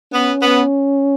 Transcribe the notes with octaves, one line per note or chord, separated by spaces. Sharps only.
B3 C#4
B3